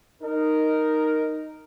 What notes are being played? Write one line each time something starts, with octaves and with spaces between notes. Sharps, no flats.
D#4 A#4